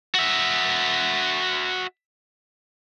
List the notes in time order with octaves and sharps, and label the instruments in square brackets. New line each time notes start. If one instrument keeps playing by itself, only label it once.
[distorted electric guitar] F#4 E5